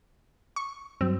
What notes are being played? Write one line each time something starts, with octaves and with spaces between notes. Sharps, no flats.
C#6
G2 F#3 C4